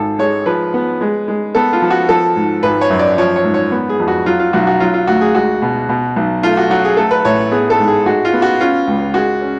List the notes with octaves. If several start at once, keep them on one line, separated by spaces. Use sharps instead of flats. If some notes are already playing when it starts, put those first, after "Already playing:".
Already playing: G#1 A4
G#3 C#5
F3 B4
B3
G#3
G#3
B3 A4
F4
F3
F#4
F3 A4
G#2
G#1 B4
C#5
F#2
D5
F3 C#5
C#5
G#2
C#5
B3
G#4
F2
F#4
F#3 F4
F4
B1 F#4
F#4
F#3 F4
F4
D2 F#4
G#4
G#3 F#4
B2
B2
B1
A3 F4
F#4
F#3 F#4
G#4
A3 A4
B4
A1 C#5
B3 G#4
A4
G#2
G#4
G#3 F#4
F4
B3
F#4
C#4 F4
C#2
G#3 F#4
C#4